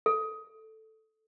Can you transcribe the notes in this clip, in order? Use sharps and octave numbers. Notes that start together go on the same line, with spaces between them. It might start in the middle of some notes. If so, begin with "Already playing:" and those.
A4